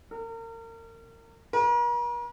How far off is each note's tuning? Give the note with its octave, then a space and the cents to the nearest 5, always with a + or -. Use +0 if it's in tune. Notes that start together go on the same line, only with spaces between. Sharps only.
A#4 -35
A#4 +45